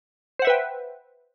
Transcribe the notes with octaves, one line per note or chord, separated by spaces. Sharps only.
B4 C5 E5 F#5 G5